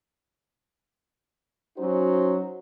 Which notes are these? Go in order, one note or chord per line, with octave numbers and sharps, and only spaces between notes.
F#3 C#4 D#4 F#4 C5